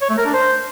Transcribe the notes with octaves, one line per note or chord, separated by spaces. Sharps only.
C#5
A3
A#4
D4
C5